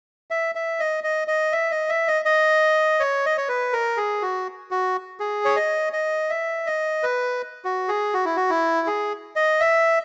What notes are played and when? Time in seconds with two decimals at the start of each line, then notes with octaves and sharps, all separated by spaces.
0.31 E5
0.55 E5
0.80 D#5
1.04 D#5
1.28 D#5
1.52 E5
1.71 D#5
1.89 E5
2.08 D#5
2.25 D#5
3.00 C#5
3.26 D#5
3.38 C#5
3.49 B4
3.73 A#4
3.97 G#4
4.22 F#4
4.71 F#4
5.20 G#4
5.45 C#5
5.56 D#5
5.93 D#5
6.30 E5
6.67 D#5
7.03 B4
7.65 F#4
7.88 G#4
8.14 F#4
8.25 E4
8.36 F#4
8.50 E4
8.87 G#4
9.36 D#5
9.60 E5